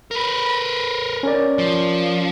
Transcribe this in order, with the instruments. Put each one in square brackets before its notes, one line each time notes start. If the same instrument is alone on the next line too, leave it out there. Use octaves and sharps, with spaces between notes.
[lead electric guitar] A#4 B4
[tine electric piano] C#4 A#4 D5
[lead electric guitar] F3